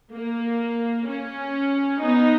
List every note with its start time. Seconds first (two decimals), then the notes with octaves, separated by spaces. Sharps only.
0.13 A#3
1.08 C#4
2.03 B3 D#4